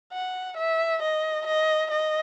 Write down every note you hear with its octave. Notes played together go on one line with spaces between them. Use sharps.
F#5
E5
D#5
D#5
D#5